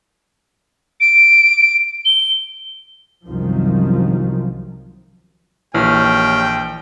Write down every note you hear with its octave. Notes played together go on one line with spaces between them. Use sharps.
D7
G7
C2 F#2 D#3 F3
A#1 D#2 E3 C#5 G5 F6